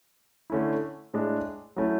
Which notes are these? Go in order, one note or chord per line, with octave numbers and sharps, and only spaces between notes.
D3 A3 C#4 E4
A2 G#3 D4
F#3 A3 C#4 E4